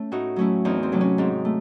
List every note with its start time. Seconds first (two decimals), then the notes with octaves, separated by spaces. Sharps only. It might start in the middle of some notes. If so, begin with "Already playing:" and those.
Already playing: A3 C#4
0.12 A2 D#4 F#4
0.36 F#3 A3 C#4 E4
0.65 E2 C4 D#4
0.83 C4
0.92 C3 F#3 A3
1.01 C#4
1.18 G#2 C4 D#4
1.45 A3